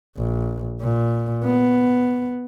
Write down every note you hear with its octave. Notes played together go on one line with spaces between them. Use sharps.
A#1
A#2
B3